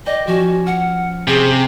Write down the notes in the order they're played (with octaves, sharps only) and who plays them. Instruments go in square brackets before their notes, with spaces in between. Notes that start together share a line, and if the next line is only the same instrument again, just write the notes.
[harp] D5 G5 [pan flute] D#5
[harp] F3 C#4 [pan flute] F#4
[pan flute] F#5 [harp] F6 C#7
[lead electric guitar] C3 [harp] C#4 G4 [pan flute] G#4